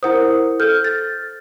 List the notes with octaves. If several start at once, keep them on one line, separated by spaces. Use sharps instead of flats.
E4 A#4 C5 F#5 D#6
A4 F6 G6
A6